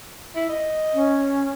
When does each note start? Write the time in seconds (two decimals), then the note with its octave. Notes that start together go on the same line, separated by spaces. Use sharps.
0.36 E4
0.49 D#5
0.94 C#4